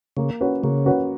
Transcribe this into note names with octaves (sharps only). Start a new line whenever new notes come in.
C#3 A#3
C#4 F#4 B4
C#3 A#3
C#4 F#4 B4